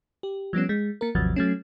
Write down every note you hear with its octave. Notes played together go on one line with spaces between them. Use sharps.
G4
F3 G3 B3 C#4
G#3
A#3 A#4
G#1 D#2 C3 F3 F#3 A6
F#3 A3 C#4